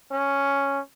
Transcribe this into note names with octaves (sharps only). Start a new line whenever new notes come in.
C#4